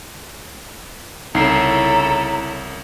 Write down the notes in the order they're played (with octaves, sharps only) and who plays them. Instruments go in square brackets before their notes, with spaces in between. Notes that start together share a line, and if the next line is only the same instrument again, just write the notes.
[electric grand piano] C2 [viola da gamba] C#3 E4 A4 [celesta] D#4 C7 [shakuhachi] A#5